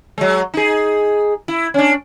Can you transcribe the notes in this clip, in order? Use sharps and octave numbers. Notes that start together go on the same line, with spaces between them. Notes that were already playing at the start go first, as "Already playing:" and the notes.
F#3 G#3
D#4 G#4
E4
C#4 D4